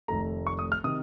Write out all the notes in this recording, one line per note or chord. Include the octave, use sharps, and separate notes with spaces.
F1 F2 D#3 A3 A#5
C#6
D#6
F6
C3 D#3 D#6